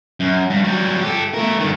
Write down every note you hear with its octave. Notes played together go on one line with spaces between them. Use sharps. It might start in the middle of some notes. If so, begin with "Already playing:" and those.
F#2
G2
F#3 G3
G4 A4
A3 A#4
G2 D#3